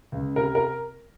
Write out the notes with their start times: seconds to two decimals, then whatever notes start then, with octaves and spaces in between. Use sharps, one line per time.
0.12 C#2
0.36 C3 A#4
0.55 A#4